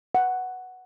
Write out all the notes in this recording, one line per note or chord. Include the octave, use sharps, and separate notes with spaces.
F#5